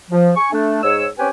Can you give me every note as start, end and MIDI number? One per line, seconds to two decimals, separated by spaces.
0.11 0.31 53
0.37 0.49 80
0.37 0.49 85
0.52 0.81 57
0.52 0.81 62
0.83 1.06 44
0.83 1.06 73
0.83 1.06 88
1.18 1.28 60
1.18 1.28 61
1.18 1.28 67
1.18 1.28 71
1.18 1.28 79
1.18 1.28 80